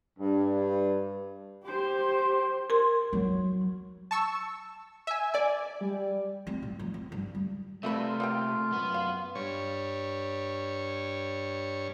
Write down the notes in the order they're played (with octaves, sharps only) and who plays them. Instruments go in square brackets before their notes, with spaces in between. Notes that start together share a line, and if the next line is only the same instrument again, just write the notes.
[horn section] G2
[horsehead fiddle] G4 C5
[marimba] A#4 C6
[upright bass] F#3
[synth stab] A5 C#6 E6
E5 G#5
D5 G#5
[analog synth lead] G3
[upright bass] C4
G#2
F3
C4
G2
G3
[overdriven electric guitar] C3 [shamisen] F3 G3 B4 [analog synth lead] A3 [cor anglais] E5
[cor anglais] F4
[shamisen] A#3 A#4 G5
[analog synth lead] F#2 [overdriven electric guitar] B3
[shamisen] F5
[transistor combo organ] G2 C#5